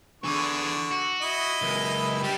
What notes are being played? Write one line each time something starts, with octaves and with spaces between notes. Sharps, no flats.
D3 E3 G#4 C#6
F#4
E4 D#5
C#2 F#2
G3 D4 G4